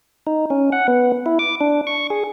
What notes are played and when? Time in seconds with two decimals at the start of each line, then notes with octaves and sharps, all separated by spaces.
0.27 D#4
0.50 C#4
0.72 F#5
0.88 B3
1.26 E4
1.39 D6
1.61 D4
1.87 C#6
2.10 G#4